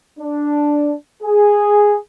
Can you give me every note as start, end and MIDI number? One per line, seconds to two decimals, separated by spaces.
0.19 0.94 62
1.23 1.97 68